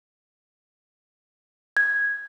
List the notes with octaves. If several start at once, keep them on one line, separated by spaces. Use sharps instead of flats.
G#6